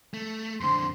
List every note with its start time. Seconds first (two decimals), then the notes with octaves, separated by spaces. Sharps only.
0.14 A3
0.61 F2 D3 C5 C6